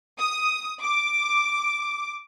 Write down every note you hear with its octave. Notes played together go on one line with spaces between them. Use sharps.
D#6
D6